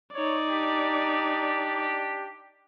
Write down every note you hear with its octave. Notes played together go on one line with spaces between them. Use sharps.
D#4 C#5 D5
D4 G4